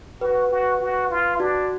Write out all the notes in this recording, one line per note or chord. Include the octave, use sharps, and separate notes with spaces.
F#4 B4
F#4
F#4
F4
D4 F#4